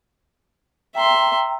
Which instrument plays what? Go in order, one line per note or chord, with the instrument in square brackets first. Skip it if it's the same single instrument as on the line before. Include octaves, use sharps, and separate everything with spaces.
[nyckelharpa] E5 C6 [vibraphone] G5 A#5